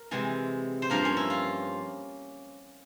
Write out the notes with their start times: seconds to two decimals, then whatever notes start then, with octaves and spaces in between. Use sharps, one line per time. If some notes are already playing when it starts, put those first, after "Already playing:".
Already playing: A#4
0.11 C3 E3 G#3
0.82 C5
0.90 G2 F3 A#3 A#4
1.05 C#4
1.17 E4
1.30 F4